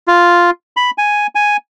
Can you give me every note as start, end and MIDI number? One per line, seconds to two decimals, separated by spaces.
0.08 0.50 65
0.77 0.91 83
0.98 1.27 80
1.35 1.57 80